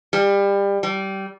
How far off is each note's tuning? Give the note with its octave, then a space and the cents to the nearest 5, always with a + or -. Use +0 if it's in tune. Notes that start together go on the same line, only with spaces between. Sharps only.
G3 +25
G3 -20